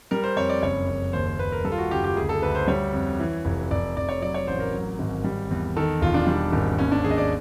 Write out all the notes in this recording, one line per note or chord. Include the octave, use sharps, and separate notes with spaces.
G3 A#4
C5
F2 C#5
D5
F#1 C#5
F#1
D#2 C5
C5
D#2 B4
A#4
G3 A4
F4
F#4
F#1 G4
G4
D2 G#4
A4
D2 B4
C5
G3 C#5
F2
E3
F1
F1 D5
F1 D5
C#5
F#3 D5
C#5
A1 C5
A#4
F#3
G#1
G3
E2
D#3 A4
E1 F4
D4
G3
G#1
D#2 C#4
D4
D#2 G#4
D#5
D5